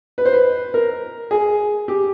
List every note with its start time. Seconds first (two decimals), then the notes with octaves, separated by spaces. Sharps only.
0.18 B4
0.25 C5
0.33 B4
0.74 A#4
1.31 G#4
1.88 G4